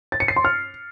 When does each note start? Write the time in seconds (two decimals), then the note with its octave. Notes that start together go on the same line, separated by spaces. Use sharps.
0.12 A6
0.20 C#7
0.28 C7
0.36 C6
0.45 F6